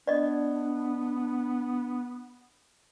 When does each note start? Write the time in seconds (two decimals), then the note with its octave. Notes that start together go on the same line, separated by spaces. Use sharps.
0.07 B3 D4 D5 D#5